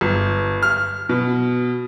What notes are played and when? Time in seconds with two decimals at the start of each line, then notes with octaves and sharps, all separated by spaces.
0.01 G1
0.63 F6
1.09 B2